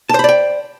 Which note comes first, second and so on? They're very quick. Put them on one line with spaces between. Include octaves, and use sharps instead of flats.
A5 C5 B5 D5 G5